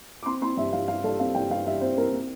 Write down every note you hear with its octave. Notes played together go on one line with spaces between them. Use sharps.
D6
C4 C6
C4 C6
G2 E5
G2 F5
G2 F5
G2 A4
C4 F5
G2 G5
G2 F5
G2 E5
C4 C5
C4 A#4
C4